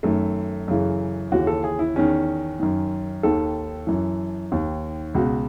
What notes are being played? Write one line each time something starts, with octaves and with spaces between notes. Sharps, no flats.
F#2 D#3 A3
F#2 C#3 E3
D#2 C#3 E3 F#4
A4
G#4
E4
E2 D#3 C#4
F#2 D#3
D#2 D#3 A4
F#2 E3
D#2 D#3
C#2 B2 F#4